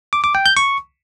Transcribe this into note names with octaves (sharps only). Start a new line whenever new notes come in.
D6
D6
G5
G6
C#6